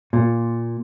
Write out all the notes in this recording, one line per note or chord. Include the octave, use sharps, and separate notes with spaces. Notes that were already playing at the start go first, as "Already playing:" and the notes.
A#2